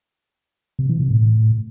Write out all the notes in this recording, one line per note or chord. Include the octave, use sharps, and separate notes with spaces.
C3
E3
C3
A2